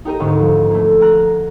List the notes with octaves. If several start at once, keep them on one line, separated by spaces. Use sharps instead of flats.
D#4 G4 A#4 D#5
G#1 D2 G#2
F3
A3 A#3
G#5 A#5 F6 F#6 A#6